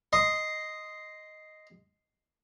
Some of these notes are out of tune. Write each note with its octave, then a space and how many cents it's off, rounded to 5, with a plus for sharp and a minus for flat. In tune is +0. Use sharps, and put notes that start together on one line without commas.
D#5 +0 C6 +0